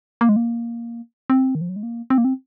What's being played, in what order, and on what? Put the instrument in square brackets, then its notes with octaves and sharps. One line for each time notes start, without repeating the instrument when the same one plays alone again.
[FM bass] A#3
G#3
A#3
C4
D#3
F3
F#3
G#3
A#3
C4
A#3
C4